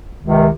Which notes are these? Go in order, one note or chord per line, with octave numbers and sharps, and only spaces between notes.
C#2 C3 D#3